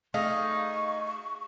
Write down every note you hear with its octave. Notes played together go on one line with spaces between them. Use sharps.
A3 D#4 G#4 F5 C#6